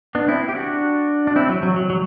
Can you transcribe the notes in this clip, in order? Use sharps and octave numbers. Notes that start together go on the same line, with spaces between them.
B3 D4
C4 E4
G4
D4 F#4
D4
C4 E4
F#3
F#3
F#3
F#3